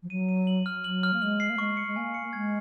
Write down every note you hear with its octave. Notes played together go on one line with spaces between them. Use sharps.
F3
F#3 D#7
D#7
F#7
F6
F#3 F#7
F6
A#3
G#3 F#7
C7
A#3
G#3 C#6
C#7
G#3
A#3 G#5
C#7
G#3 G#6